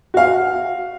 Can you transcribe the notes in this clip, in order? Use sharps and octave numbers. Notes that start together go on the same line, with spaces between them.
F#4 F5